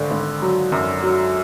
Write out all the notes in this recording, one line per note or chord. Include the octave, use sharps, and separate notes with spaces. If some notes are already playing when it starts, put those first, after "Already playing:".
Already playing: G#1 D3
G#1
F#3
F#2
F#3